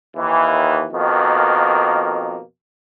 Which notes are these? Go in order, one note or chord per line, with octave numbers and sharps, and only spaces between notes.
D#2 E3
F2 B2 D#3 A#3